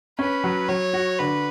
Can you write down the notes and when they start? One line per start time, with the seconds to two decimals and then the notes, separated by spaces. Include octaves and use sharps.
0.19 C#4 B4
0.44 F#3
0.69 F#3 C#5
0.93 F#4
1.19 D3 B4